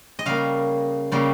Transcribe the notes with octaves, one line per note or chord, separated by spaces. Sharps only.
D#5
C#3 G3 A#3 F5
C#3 G3 A#3